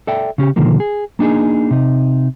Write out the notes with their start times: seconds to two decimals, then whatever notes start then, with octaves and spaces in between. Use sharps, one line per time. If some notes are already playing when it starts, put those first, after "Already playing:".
0.07 A4 D5 E5 G5
0.38 C#3 C#4 G4
0.56 B2 D3 D#3 F3 A#3
0.80 G#4
1.19 A#3 D4 D#4 G#4
1.71 C3 D#4